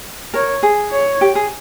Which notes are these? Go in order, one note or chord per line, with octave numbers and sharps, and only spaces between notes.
A#4 C#5
G#4
C#5
G4
G#4